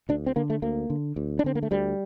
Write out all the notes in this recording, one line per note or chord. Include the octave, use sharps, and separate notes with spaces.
D2 D4
C4
D3 A#3
A3
D2 A#3
D3
D2
D4
D3 C4
A#3
A3
D2 G3